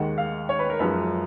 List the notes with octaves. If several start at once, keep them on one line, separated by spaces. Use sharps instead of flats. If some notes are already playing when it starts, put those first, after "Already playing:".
Already playing: D#2 D#3 G#3 F#5
F5
C#5
B4
A#4
F#2 F3 G#3 B4